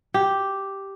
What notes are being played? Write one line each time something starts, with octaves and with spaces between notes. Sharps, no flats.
G4